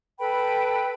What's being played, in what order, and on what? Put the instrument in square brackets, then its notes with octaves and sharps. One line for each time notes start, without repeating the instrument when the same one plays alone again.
[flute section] A4 B4 G5 B5